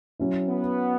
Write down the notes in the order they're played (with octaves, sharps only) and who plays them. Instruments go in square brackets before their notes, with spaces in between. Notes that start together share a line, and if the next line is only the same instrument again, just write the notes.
[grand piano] F#3 C#4 E4
[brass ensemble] B3